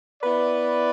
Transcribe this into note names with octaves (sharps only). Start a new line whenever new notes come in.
B3 E4 B4 D5